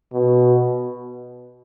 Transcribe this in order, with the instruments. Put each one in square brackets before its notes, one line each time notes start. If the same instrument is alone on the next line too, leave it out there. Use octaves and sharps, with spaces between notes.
[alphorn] B2